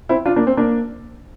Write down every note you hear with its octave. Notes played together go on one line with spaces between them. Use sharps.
C4 E4
D4 F4
A#3 D4
C4
A#3 D4